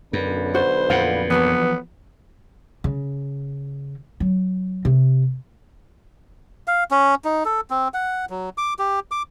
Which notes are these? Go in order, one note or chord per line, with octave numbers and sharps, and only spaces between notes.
B1 F#2 D3 B4
F#4 C5
F2 A#2 F5 F#5
E2 F3 F#3 B3
C#3
F#3
C3
F5
C#4
D#4
A4
C4
F#5
F#3
D6
G4
D6